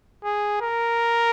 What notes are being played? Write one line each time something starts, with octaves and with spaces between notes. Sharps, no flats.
G#4
A#4